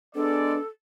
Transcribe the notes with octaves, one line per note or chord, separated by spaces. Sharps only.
G#3 B3 D4 A4 D5